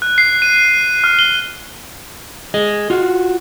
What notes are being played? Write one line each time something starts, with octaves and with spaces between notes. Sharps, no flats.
F#6
C7
D#7
F6
G7
G#4 D#5
F4 F#4